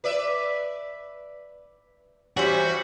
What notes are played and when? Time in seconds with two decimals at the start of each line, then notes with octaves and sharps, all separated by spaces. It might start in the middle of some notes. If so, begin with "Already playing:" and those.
0.04 B4 D5 E5
2.37 E3 G3 C#4 F#4 C5